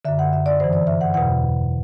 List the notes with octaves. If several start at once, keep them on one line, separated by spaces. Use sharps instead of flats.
F#2 D3 E5
F#5
E5
D5
G2 E3 C5
D5
E5
F#5
E2 B2 F#5